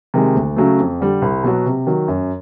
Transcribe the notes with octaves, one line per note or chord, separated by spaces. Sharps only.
C3 D#3 G#3
D2
C#3 F#3 A3
F2
D3 G3
C2
B2 F#3
C3
D#3 F#3
F#2